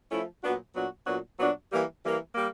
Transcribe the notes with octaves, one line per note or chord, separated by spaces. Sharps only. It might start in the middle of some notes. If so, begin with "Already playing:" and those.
F3 A3 C#4 E4
A#2 F#3 B3 D4 F#4
A#2 F#3 B3 D4 F#4
A#2 F#3 B3 D4 F#4
A#2 F#3 B3 D4 F#4
E3 G3 A#3
E3 G3 A#3
G3 A#3